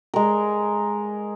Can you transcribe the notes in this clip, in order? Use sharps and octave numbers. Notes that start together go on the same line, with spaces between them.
G#3 A#4